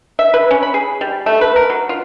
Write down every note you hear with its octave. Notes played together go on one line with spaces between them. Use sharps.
E5
B4
C#4
B5
G#4
G3
A3
B4
A#4
F#3
F4